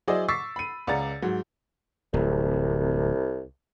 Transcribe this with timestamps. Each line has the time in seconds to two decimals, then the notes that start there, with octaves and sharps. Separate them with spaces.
0.07 F#3 E4 G#4 C5 D5 D#5
0.28 C#6 D6 E6 A6 B6 C7
0.56 B5 D#7
0.87 C#2 D5 F#5 A#5 A6
1.22 G#2 F#3
2.14 D1 C2